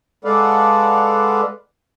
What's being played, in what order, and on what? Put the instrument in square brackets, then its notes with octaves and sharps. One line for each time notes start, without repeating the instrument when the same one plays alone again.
[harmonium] G#3 A4 B4 D5 F5 F#5